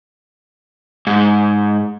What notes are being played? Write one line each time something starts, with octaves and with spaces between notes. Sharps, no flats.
G#2